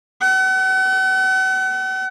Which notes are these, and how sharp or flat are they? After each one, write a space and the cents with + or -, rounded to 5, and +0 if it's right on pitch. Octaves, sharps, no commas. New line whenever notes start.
F#5 +40